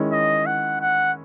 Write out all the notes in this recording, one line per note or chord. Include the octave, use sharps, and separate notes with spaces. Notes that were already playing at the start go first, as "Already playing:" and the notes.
Already playing: D#3 G#3 C#4 E4
D#5
F#5
F#5